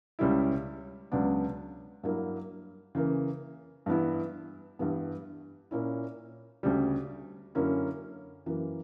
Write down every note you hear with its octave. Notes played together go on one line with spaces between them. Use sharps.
C#2 C#3 G3 C#4 E4
C#2 C#3 F#3 B3 D4
G2 F#3 A#3 E4
C#3 E3 A#3
G2 E3 B3 E4
G2 E3 G3 B3
A#2 A#3 C#4 E4
D2 C#3 G3
F#2 D3 A#3 C#4 E4
F#2 E3 A#3